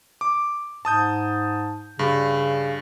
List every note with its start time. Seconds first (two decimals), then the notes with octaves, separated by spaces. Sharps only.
0.21 D6
0.85 G#2 A5 D#6 G6
1.99 G2 C#3